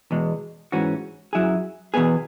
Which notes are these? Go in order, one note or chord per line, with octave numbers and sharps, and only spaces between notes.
E2 B2 G#3
G#2 E3 C#4 F#4
F#2 F#3 E4 G#4
E2 B2 B3 G#4